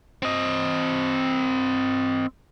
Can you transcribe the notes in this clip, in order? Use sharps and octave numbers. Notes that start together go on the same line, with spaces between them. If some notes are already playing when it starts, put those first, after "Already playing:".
C4 D#5